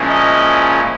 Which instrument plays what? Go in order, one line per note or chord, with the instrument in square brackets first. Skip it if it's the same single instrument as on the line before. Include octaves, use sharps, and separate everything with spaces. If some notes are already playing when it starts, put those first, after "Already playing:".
Already playing: [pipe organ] A#2 F3 G#3 C#4 E4
[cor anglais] D#5